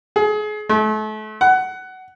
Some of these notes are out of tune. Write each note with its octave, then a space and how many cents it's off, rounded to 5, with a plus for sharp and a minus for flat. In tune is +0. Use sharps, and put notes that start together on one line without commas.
G#4 +30
A3 -40
F#5 +15